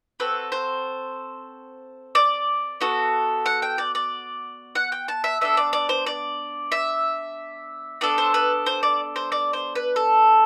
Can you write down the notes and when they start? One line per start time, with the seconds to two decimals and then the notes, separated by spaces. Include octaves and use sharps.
0.20 C4 F#4 A4 B4
0.52 C5
2.15 D5
2.81 B3 F#4 A4
3.46 F#5
3.62 G5
3.78 D5
3.95 D5
4.75 F#5
4.92 G5
5.08 A5
5.24 E5
5.41 B3 D4 A4 E5
5.57 D5
5.73 D5
5.89 C5
6.06 D5
6.72 E5
8.01 B3 D4 A4 D5
8.18 C5
8.34 B4
8.66 C5
8.83 D5
9.16 C5
9.32 D5
9.53 C5
9.75 B4
9.96 A4